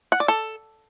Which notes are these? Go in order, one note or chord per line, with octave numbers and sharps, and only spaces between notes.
F#5
D5
A4